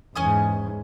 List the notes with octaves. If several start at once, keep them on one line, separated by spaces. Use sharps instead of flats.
E2 G#2 C#4 G#5 D#6